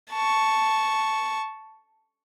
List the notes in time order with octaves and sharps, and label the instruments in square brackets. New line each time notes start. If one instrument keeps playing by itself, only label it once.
[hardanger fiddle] A5 C#6